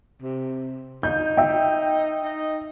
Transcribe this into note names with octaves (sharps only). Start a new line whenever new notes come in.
C3
D#4 G6
E5 G5
D#4